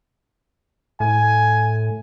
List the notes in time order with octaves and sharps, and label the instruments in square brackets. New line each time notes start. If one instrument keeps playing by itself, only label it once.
[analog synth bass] A2 [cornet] G#5